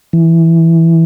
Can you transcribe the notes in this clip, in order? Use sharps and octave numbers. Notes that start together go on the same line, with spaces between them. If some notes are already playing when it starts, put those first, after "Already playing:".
E3